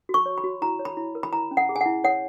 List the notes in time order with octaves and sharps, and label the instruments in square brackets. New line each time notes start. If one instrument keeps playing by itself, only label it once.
[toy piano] F#4
C#6
C#5
B5
F#4
E4 A#5
C#5
B5
E4
A#4
B5
E4 A#5
C#4
F#5
G#4
G#5
E4 F#5
C#5 F#5